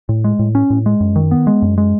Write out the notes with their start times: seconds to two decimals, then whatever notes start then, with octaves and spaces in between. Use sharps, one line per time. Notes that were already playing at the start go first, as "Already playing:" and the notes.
0.09 A2
0.24 G#3
0.39 A2
0.55 C#4
0.70 A2
0.86 G#3
1.00 F#2
1.16 D#3
1.31 B3
1.47 G#3
1.62 F#2
1.78 G#3